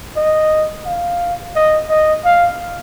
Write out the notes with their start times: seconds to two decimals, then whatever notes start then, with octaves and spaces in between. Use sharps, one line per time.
0.16 D#5
0.86 F5
1.55 D#5
1.90 D#5
2.25 F5